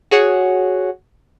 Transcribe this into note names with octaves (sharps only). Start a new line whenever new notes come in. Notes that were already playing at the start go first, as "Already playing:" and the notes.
F#4 G#4 C#5 F#5